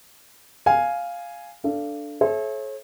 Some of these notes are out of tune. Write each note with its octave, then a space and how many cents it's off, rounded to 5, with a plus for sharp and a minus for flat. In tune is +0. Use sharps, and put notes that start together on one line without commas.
F5 +0 G#5 +0
D4 +0 A4 +0 F5 -25
A4 -45 C#5 -40 E5 +5